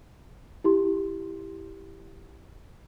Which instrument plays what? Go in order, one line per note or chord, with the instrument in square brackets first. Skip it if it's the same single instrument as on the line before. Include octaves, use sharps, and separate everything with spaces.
[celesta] E4 G4 C6